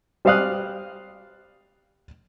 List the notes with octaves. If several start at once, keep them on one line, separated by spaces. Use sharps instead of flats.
G3 C5 D5 F5 D#6 F#6